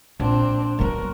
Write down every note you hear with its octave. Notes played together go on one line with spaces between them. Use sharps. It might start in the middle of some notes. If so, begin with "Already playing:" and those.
A#1 C4 D4
F#3 B3 F#4 A#4